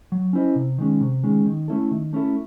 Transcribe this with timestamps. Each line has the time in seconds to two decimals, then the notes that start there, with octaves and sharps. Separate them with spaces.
0.12 F#3
0.33 C#4 E4 C5 D#5
0.56 C3
0.78 D#3 G#3 C#4
1.01 C3
1.24 D#3 G#3 C#4
1.46 D#3
1.68 A3 C#4 E4 A4
1.91 D#3
2.13 A3 C#4 E4 A4